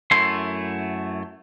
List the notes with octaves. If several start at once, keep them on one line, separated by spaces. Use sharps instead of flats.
F#2 A3 E4 C6